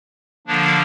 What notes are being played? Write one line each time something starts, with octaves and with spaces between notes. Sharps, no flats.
D3 F3 A#3 D4